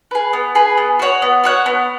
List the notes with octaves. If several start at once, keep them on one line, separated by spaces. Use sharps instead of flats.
G#4 B4
B3
G#4 B4
B3
F#4 C#5 F#5
B3
F#4 C#5 F#5
B3